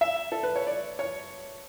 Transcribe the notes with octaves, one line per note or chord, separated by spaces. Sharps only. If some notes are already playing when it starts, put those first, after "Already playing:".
E5
A4
B4
C#5
D5
C#5